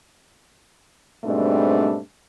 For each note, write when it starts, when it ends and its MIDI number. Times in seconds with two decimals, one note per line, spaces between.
1.24 1.98 44
1.24 1.98 47
1.24 1.98 55
1.24 1.98 57
1.24 1.98 60
1.24 1.98 62